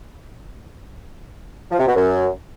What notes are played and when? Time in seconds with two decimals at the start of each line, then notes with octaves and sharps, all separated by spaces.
1.71 F3
1.79 C3
1.87 B2
1.95 F#2